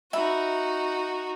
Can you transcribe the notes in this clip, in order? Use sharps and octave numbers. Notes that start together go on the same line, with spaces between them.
D#4 F#4 E5 B5